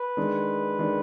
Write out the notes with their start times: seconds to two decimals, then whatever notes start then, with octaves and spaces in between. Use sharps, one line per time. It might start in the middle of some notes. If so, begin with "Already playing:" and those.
Already playing: B4
0.17 D#3 G#3 D4
0.79 D#3 G#3 D4